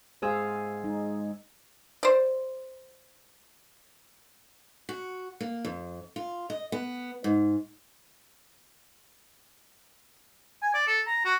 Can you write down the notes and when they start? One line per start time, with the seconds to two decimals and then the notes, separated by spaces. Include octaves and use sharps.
0.22 G#2 G#4 C5 F5 E6
0.84 G#3 D#4
2.03 C5 D5
4.89 F#4
5.41 A#3
5.65 F2
6.16 F4
6.50 D#5
6.72 B3
7.24 G#2
10.63 G#5
10.74 D5
10.87 A4
11.07 A#5
11.25 F#4